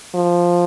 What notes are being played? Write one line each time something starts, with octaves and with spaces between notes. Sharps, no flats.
F3